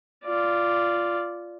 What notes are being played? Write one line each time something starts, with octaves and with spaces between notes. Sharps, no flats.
F4 D5